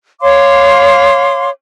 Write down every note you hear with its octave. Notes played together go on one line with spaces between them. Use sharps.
C#5 F5 C6 D6